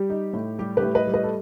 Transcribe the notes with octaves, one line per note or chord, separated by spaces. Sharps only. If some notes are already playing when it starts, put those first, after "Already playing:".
Already playing: G3 G4
D#4
A2
G3 G4
G4 B4
A2
B4 D#5
G3
B4 D#5
A4